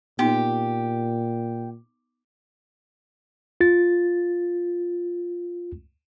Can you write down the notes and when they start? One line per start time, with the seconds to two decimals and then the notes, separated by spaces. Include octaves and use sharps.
0.19 A#2 B3 D#4 G4
3.61 F4 A6